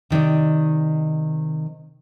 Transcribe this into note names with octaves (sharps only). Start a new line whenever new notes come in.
C3 D#3 D#4 D5